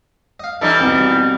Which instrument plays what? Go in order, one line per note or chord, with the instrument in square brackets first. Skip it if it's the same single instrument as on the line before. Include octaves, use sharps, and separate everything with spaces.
[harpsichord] D#5 F5
[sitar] E3 G3 D#4 [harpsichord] A4 G#5
[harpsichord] C2 B2